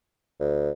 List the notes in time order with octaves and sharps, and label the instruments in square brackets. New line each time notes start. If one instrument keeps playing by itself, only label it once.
[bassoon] D2